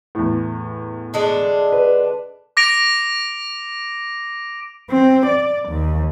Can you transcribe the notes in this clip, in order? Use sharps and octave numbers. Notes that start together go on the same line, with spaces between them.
E2 A2
D3 G#3 D4
B4
D6 A#6 D7 F7
C4
D5
D#2